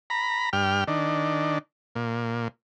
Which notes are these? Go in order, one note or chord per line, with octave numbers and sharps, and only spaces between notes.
A#5 B5
G2 G5 F6
D#3 D4
A#2